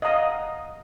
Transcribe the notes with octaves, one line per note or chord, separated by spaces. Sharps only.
D#5 F5 F#5 A#5 D#6